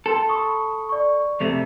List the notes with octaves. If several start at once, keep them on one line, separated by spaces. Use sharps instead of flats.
A4 G5 C6
B5 C#6 D#6
D5 C#6
F2 C3 A3 F7